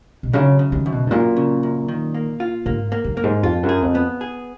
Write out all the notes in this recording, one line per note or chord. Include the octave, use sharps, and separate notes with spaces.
B2
F#2 C#3
C#3
D#3
F#2
B2
G#2
F#2 A#2
C#3
F#2
D#3
A#3
F4
G#2 A#3
A#3
F#2
A#3
G#2
F2 F4
F#2
G#4
F2
B3
G#4